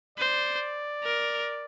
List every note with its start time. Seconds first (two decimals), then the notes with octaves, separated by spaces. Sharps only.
0.18 C5 D5
1.04 A#4